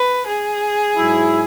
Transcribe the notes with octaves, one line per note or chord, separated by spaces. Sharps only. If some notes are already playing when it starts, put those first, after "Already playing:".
Already playing: B4
G#4
G#2 F#3 E4